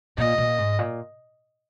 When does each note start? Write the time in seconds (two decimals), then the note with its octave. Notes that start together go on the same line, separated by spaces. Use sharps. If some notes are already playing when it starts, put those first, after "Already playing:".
0.18 A#2 D#5
0.38 A#2
0.58 G#2
0.79 A#2